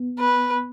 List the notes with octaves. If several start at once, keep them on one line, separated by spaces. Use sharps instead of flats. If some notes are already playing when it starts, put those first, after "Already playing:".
Already playing: B3
B4